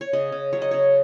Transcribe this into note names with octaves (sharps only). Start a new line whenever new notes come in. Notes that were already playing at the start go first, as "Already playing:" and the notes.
C#5
C#3 D#5
C#3
F#3 C#5
D#5
C#3 C#5